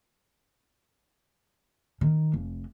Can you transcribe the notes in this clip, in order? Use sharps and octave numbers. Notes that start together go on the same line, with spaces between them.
D#3
F1